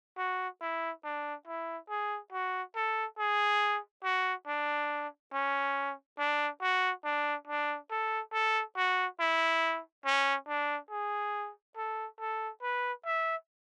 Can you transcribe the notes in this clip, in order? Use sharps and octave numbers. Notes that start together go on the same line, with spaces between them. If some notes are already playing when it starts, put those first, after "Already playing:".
F#4
E4
D4
E4
G#4
F#4
A4
G#4
F#4
D4
C#4
D4
F#4
D4
D4
A4
A4
F#4
E4
C#4
D4
G#4
A4
A4
B4
E5